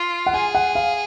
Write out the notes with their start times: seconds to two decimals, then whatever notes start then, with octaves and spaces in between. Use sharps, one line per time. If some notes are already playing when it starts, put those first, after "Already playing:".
Already playing: F4
0.26 F#5
0.34 G#4 G#5
0.55 F#5
0.75 F5